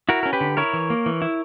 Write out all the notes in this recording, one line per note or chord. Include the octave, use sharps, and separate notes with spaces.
E4 F#4 A#4
C#4 A#4
G4 B4
D3
E4 A#4 C#5
E3
A#3
E3
E4